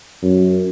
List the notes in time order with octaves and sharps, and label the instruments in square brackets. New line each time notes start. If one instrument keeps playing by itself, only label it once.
[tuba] F#2